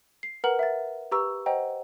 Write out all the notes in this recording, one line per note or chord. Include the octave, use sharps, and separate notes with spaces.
C7
A#4 B4 F#5 A#5 F6 F#7
E5 F#5 A6
G4 B4 A#5 C#6 E6
C5 D#5 F#5 G5 A#5